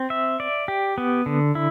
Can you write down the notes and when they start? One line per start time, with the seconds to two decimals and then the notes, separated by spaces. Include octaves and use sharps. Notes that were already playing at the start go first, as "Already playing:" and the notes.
Already playing: C4
0.10 E5
0.40 D5
0.68 G4
0.98 B3
1.26 D3
1.55 E4